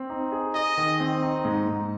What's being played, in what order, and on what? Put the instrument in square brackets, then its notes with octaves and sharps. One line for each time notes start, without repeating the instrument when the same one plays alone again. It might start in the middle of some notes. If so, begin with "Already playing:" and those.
Already playing: [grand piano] C4
D#4
G#4
[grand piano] G#4 [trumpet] D#5
[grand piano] D#3
C4
D#4
G#2
G#2